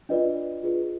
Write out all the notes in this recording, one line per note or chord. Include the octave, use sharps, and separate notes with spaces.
D4 F4 B4 D5 D#5
F4 G#4 B4